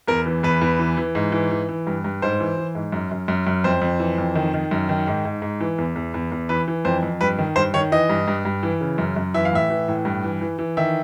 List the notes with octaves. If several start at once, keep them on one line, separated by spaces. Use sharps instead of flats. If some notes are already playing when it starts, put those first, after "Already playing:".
E2 A#4
E3
E2 B4
E2
E3
E3
G#2
E3
E3
E3
G2
G2
G#2 C5
E3
E3
G#2
F#2
F#2
F#2
F#2
F2 C5
F2
E3
F2
D#3
D#3
F#2
D#3
G#2
G#2
G#2
E3
E2
E2
E2
E2
E3 B4
E3
F2 C5
F2
G2 B4
D#3
G2 C5
D#3 C#5
E3 D#5
G2
G2
G2
E3
C#3
F#2
F#2
E3 E5
F5
A2 E5
E3
A2
G2
E3
E3
E3
D#3 E5